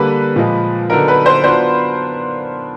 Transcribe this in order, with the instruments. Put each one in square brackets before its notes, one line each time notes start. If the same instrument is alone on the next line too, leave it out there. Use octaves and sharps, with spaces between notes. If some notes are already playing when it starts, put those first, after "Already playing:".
Already playing: [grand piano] D3 G3 A#3 [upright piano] B4
[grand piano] A#2 F3 G#3
[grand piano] D3 F#3 B3 D#4 [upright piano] A#4
[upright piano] B4
C5
[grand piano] F#3 B3 D4 F4 [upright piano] C5